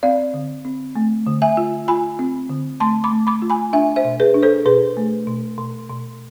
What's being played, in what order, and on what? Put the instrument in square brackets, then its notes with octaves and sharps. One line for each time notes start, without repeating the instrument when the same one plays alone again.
[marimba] C4 D5 F5
D3
C4
A3
D3
E5 G#5
F4
F4 G#5 B5
C4
D3
A3 A5 C6
B5 D6
A3
B5 D6
F4
G#5 B5
D4 E5 G#5
C5 E5
B2
G#4 B4
D4
A4 C5
B2 G#4 B4
A3
B2
B2
B2